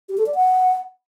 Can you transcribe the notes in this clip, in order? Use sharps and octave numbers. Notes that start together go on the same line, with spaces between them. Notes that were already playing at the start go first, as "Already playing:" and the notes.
G4
A4
D5
F#5